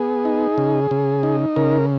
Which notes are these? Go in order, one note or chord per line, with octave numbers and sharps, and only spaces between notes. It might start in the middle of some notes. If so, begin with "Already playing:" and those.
Already playing: B3 G#4
D#4
C#3
C#3
D#4
C#3 A#4